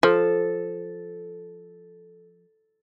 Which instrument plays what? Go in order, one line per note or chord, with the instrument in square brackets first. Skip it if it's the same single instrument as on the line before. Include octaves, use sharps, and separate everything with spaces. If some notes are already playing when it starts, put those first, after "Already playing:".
[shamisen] F3 [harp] A4